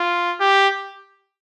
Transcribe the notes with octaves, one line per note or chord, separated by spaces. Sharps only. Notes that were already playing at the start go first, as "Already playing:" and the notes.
Already playing: F4
G4